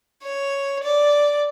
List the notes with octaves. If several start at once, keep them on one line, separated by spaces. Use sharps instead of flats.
C#5
D5